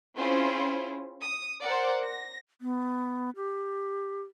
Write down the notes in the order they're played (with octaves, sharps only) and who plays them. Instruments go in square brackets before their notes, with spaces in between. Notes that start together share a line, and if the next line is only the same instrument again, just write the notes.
[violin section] C4 C#4 E4 F4 G#4 C5
D#6
A#4 C5 D5 F#5
A#6
[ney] B3
G4